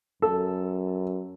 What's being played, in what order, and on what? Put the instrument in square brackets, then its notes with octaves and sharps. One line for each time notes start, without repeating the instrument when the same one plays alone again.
[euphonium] F#2 [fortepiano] A4